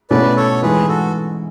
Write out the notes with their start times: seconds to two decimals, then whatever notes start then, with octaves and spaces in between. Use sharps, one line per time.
0.10 B2 A3 C#4 E4 B4 D5
0.37 A4 C#5
0.62 G#2 E3 G#3 G#4 B4
0.88 F#4 A4